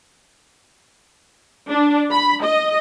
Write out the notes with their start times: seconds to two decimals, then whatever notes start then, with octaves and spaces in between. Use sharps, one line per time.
1.70 D4
2.12 B5
2.43 D#5